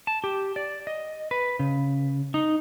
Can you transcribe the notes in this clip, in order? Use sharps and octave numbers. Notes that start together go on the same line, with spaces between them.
A5
G4
D5
D#5
B4
C#3
D#4